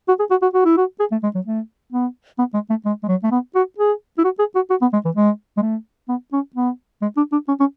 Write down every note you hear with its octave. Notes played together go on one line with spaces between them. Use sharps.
F#4
G#4
F#4
F#4
F#4
E4
F#4
G#4
A3
G#3
F#3
A3
B3
B3
G#3
A3
G#3
G#3
F#3
A3
B3
F#4
G#4
E4
F#4
G#4
F#4
F#4
B3
G#3
E3
G#3
G#3
A3
B3
C#4
B3
G#3
D4
D4
C#4
C#4